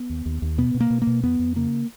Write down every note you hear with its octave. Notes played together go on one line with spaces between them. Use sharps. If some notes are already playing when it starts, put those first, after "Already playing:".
Already playing: B3
D#2
D#2
D#2
B2 B3
B2
A#3
B2
A#3
B2
F2 B3
F2
C#3 A#3